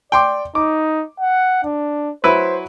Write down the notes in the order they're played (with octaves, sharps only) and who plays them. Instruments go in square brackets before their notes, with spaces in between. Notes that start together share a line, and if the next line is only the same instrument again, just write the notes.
[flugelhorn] D5 [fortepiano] G5 C6 D6
[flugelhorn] D#4 [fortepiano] D6
[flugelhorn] F#5
D4
[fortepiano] F#3 E4 B4 [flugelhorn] C5